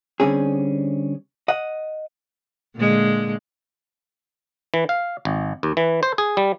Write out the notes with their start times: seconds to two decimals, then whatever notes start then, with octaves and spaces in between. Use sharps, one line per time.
0.20 D3 G3 C4 C#4 G#4
1.48 D#5 F#5
2.75 A#2 D3 G#3
4.74 E3
4.89 F5
5.25 G#1
5.63 D#2
5.77 E3
6.03 C5
6.18 G#4
6.37 G3